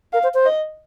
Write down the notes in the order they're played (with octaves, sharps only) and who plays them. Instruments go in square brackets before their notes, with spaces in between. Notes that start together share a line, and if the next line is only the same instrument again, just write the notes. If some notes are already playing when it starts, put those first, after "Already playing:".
[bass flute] A#4 [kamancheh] F5
[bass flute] C5
C5
[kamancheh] D#5